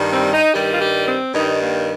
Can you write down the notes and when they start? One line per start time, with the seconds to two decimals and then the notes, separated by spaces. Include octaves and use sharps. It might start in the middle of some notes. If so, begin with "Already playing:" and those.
Already playing: G2 D#3 G3
0.13 C4
0.33 D#4
0.54 G2 D#3 G3 G4
0.72 F4
0.81 G4
1.07 C4
1.34 G2 D#3 G3 D#4
1.62 A#3